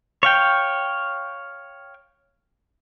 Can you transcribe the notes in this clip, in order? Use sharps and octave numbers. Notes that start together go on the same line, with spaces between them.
C#5 F5 G5